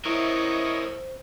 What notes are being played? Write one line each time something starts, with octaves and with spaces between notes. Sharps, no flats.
E4 A#4 C5 C#5 D#5 E5